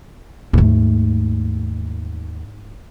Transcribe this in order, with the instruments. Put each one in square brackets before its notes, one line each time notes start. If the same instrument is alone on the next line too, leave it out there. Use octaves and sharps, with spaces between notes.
[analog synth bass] D#2 [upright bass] G#2 A3